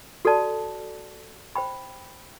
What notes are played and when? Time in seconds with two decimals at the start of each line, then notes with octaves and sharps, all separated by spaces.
0.25 F#4 A4 D5 A5
1.56 C5 G5 B5